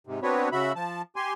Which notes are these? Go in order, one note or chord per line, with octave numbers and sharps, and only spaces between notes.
G#2 C3
B3 C4 D4 F#4 B4 C#5
C#3 F#4 E5 B5
F3 A5
G4 G#5 C6